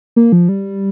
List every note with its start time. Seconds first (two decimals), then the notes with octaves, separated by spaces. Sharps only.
0.16 A#3
0.32 F3
0.49 G3